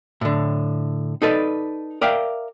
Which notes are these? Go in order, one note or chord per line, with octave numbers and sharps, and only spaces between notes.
A2 D3
D#4 A4 B4 D5
A#4 D5 E5 F5 G5